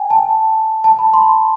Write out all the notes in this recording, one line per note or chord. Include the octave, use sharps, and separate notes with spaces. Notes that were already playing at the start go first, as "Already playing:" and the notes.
Already playing: G5 G#5
A5
A5
B5
C6